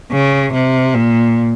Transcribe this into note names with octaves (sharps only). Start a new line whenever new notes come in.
C#3
C3
A#2